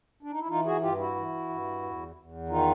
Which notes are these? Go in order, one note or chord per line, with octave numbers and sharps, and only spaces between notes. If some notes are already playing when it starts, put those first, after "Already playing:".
D4
D#4
E4
E3 D#4 F4
F#4 G#4
G2 F4 G4
E4 F#4
E3
G2
E2
E2
D#3 D#4 F4